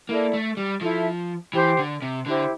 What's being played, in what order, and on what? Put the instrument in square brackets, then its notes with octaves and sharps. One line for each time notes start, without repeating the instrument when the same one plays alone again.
[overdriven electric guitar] A#3 [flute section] E4 A4 D5
[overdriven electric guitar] A3
G3
[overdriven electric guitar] F3 [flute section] E4 A4 E5
[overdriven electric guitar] E3 [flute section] G4 C5 G5
[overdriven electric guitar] D3
C3
[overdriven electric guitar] D3 [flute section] E4 G4 C5